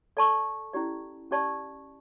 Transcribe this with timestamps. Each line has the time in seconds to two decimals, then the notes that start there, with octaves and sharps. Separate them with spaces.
0.17 A4 D5 A5 C#6
0.73 C#4 E4 G4 D5
1.31 C#4 G4 D5 A5 C#6